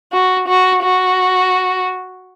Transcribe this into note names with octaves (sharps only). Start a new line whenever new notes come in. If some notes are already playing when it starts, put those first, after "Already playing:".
F#4
F#4
F#4